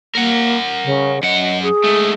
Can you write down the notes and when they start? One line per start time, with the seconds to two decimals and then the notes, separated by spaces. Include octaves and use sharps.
0.15 A#3 A#4 F#5
0.85 C#3
1.23 F#2 D#5 F#5
1.62 G#4
1.84 G#2 A3